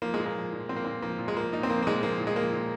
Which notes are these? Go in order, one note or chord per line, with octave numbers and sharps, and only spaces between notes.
F3 A#3
G#3
A#2
A#3
F3
A#2
F3 C4
A#3
A#2 C4
F3 A#3
A#2
G#3
F3 A#3
A#2 D#4
C4
F3 A#3
A#3
A#2 G#3
F3 A#3
A#2
G#3
F3 A#3
A#2